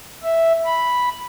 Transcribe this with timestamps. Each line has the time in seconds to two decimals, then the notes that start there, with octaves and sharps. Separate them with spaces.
0.24 E5
0.65 B5